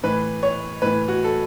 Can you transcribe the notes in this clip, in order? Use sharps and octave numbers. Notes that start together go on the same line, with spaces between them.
A2 E3 B4
C#5
A2 E3 B4
F#4
A4